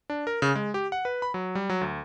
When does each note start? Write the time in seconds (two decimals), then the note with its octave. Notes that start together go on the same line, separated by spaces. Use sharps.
0.10 D4
0.27 A#4
0.42 C#3
0.55 G#3
0.74 G4
0.92 F#5
1.05 B4
1.22 B5
1.34 F#3
1.55 G3
1.69 F#3
1.81 D2